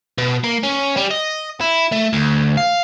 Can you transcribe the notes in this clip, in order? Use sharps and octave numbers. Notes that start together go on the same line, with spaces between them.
B2
A#3
C#4
G3
D#5
E4
A3
D2
F5